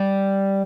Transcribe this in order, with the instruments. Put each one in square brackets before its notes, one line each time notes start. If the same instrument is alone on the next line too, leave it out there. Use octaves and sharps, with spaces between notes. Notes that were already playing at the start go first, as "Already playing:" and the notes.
Already playing: [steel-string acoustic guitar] G3